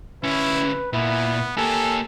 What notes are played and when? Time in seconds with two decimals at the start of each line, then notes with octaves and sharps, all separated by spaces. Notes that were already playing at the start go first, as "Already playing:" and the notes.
0.24 D2 C#4 E4 B4
0.93 A#2 B3 E4
1.57 A#3 G4 A4 G#5